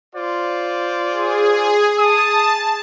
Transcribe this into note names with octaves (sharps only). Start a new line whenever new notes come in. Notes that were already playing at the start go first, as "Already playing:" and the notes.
F4 C5 D5
G#4
A5 D#6